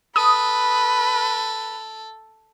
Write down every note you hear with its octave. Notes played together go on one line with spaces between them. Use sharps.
A4 B4 D#6